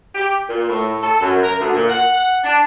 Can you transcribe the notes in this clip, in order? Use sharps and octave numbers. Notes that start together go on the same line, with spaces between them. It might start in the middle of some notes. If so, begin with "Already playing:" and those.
G4
A#2
A2
A4
F#2
A#4
D2
A#2
F#5
D4